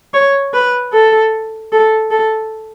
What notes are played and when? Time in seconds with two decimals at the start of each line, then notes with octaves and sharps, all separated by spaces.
0.14 C#5
0.53 B4
0.93 A4
1.72 A4
2.11 A4